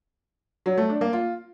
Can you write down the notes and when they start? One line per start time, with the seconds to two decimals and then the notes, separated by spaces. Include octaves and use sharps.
0.66 F#3
0.77 A3
0.89 D4
1.01 A#3
1.13 F4